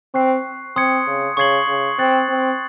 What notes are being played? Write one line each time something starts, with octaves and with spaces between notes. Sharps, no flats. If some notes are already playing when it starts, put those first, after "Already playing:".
C4 C#6 F#6 C7
C4 C6 D#6 G#6 C#7
C#3
C#3 C#6 G#6 C7 F#7
C#3
C4 F#6 A6 C#7 F#7
C4